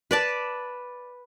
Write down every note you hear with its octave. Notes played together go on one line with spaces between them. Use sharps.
B4 D5 A5